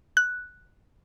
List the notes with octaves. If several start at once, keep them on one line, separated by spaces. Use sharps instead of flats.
F#6